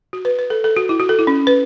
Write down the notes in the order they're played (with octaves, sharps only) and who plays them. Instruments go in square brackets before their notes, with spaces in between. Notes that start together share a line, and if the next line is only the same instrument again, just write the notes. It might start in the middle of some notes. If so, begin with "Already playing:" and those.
[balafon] F#4
B4
B4
A4
A4
F#4
E4
F#4
A4
E4
C#4
B4